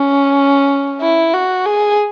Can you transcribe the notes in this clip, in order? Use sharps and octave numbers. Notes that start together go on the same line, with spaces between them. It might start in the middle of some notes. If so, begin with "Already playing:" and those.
Already playing: C#4
E4
F#4
G#4